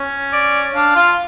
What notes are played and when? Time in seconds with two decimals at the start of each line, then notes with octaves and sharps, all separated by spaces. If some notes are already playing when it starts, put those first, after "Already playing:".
Already playing: C#4
0.33 D5
0.74 D4 F5
0.95 F4